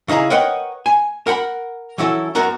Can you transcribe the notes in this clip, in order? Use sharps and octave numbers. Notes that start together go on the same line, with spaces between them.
C#3 D#4 E4 G#4 A#5
A#4 B4 C#5 D#5 F#5 G5
G#5
A#4 F#5 G5 B5
E3 F#3 C#4 E4 A4
F#2 B3 F#4 A#4 A#5